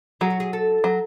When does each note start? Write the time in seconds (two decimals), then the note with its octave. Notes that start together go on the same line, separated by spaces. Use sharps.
0.21 F#3 G#4
0.30 F#4
0.40 G#4
0.53 A4
0.84 F#3